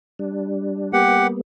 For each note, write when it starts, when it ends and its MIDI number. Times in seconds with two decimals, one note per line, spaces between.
0.19 0.93 55
0.19 0.93 62
0.93 1.41 55
0.93 1.41 58
0.93 1.41 59
0.93 1.27 67
0.93 1.27 78